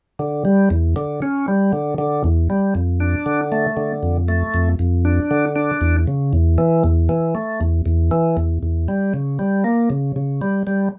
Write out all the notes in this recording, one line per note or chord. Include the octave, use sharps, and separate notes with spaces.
D3
G3
E2
D3
C#4
G3
D3
D3
E2
G3
F2
D4
D3
A3
D3
F2
A3
F2
F2
D4
D3
D4
E2
C#3
E2
E3
E2
E3
A3
E2
E2
E3
E2
E2
G3
C#3
G3
A#3
C#3
C#3
G3
G3